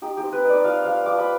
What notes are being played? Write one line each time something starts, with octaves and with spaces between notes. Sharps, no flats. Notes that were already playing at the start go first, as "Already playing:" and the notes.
D#4 G4
G4
C4
B4
D#4
D5
F3 F5
F3 F5
F3 D6
B5